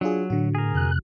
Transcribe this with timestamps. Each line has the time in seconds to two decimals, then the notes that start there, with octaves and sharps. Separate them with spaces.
0.01 F#3 D4 F4 G#4
0.30 A2 D3 F#4
0.55 G#4 A#4
0.75 F2 C3 F#6